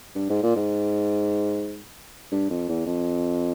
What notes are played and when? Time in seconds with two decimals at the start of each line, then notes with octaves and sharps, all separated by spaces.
0.15 G2
0.29 G#2
0.43 A#2
0.56 G#2
2.32 G2
2.50 F2
2.68 E2
2.86 F2